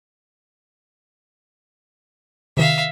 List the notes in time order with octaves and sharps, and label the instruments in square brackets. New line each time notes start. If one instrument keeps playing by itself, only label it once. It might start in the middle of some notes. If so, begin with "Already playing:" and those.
[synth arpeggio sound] C3 D#3 [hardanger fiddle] E5 F5